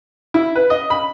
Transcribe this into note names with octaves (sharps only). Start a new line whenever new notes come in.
E4
B4
D#5
B5